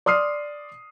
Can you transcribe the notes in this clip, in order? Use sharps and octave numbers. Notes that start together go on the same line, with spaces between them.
D5 C6 D#6 F6 C7